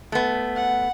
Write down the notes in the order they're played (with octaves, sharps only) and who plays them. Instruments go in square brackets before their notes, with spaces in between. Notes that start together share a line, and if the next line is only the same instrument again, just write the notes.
[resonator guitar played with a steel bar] A3 B3
[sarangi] F#5